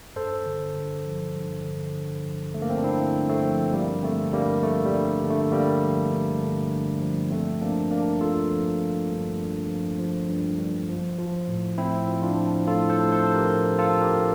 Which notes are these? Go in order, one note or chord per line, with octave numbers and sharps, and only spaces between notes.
G2 A4 C5
D3
G2
F3
G2
D3
G2
F3
G2 A3
A#3
C4
D4
D3 C4 E4
G2
A3 C4
F3
G2 G3 A#3
D3 A3 C4
G2 G3 A#3
F3 A3
G3
G2
D3
A3
G2 G3 A#3
F3
G2
D3
G2
F3
F3 A3 C4
F3 A#3 D4
G2 A#3 D4
G2 F4 A4
F3
F3
G2
G2
F3
F3
G2
G2
F3
F3
A2
A2 C4 E4
F3
D4 F4
F3
A2 F4 A4
A4 C5
A2
A4 C5
F3 C5
G4 A#4
F3
F4 A4
A2
G4 A#4
A2